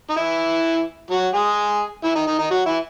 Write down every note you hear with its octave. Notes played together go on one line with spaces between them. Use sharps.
D#4
E3 E4
F#3 F#4
G#3 G#4
E3 E4
D#3 D#4
D#3 D#4
D#3 D#4
F#3 F#4
E3 E4